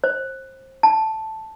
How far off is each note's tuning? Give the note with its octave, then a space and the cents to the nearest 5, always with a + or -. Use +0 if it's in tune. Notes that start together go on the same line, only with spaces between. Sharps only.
C5 +25
A5 +0